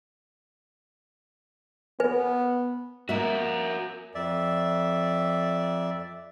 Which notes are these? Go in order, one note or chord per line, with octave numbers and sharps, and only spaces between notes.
B3 B4 G#5
A#3 F#4 A#4 E5
F2 D5 E5